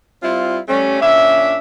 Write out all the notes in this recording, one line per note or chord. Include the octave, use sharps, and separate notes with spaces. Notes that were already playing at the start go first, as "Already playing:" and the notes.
G3 C4 E4 F4
G3 A3 C#4
A#2 C#4 D4 E5